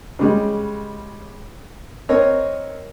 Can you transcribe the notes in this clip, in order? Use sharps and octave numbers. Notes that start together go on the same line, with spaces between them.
C#3 G3 G#3
C4 A#4 C#5 D#5